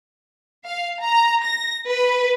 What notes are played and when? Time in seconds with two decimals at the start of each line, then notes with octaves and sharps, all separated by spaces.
0.67 F5
1.02 A#5
1.42 A#6
1.88 B4